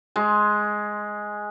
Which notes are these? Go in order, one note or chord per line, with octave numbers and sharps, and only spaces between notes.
G#3